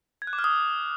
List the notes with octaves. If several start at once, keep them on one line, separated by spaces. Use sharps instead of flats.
G#6
F#6
D6
F6
D#6